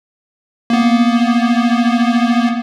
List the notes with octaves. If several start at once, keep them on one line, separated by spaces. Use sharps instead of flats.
A#3 B3